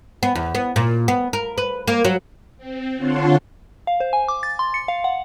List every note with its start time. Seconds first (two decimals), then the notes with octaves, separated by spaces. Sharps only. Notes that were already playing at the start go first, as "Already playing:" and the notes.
0.23 B3
0.35 E2
0.55 B3
0.76 A#2
1.08 B3
1.33 A#4
1.58 B4
1.88 A#3
2.05 F#3
2.57 C4
2.96 D3 F4 C#5 F#5 A5 C6
3.87 F5
4.00 C5
4.13 G#5
4.28 D6
4.43 A6
4.59 C6
4.74 C#7
4.88 F5
5.04 F#5